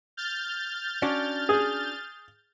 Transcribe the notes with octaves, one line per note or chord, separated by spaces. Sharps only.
F6 G6 A6
C#4 D4 F#4
G#4